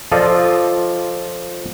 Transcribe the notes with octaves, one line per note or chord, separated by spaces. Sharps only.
F3 F4 A4 D5 D#5